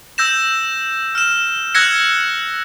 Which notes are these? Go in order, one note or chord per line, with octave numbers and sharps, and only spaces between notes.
E6 G6 A#6 E7
F6 E7
E6 F#6 G#6 A#6 C#7